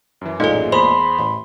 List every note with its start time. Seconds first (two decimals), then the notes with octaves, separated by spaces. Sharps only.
0.21 F#2 E3
0.40 A1 A#2 G#3 D#4 A4
0.72 E2 C5 B5 C6
1.18 A1